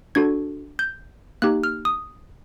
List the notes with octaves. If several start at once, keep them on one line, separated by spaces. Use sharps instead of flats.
D4 F#4 A4 G#6
G6
A#3 D#4 G4 F#6
F6
D#6